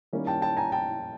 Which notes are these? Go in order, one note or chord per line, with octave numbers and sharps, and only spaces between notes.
D#3 G3 A#3 C#4 E4
G5 A5
G5 A5
G#5 A#5
G5 A5